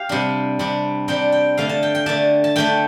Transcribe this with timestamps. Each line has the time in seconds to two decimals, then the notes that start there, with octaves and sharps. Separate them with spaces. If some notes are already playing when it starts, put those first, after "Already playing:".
Already playing: G4 F5
0.09 C3 G3 D4
0.59 C3 G3 D4
1.08 C3 G3 D4 G5
1.32 G5
1.57 D3 A3 D4 F5
1.69 A5
1.83 G5
1.95 G5
2.06 D3 A3 D4 A5
2.44 A5
2.56 D3 A3 D4 G5